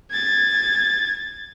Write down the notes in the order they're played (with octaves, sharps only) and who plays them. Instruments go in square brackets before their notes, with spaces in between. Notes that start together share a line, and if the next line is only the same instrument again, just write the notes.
[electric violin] G#6 A6